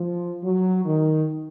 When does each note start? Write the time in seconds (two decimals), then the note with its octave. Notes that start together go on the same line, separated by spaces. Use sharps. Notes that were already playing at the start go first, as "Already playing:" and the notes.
Already playing: F3
0.43 F#3
0.85 D#3